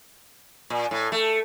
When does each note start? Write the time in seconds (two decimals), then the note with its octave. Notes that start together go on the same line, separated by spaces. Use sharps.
0.70 A#2
0.91 A2
1.12 A3